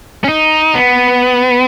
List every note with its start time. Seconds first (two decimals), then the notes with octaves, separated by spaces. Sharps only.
0.24 C#4
0.29 D#4
0.75 B3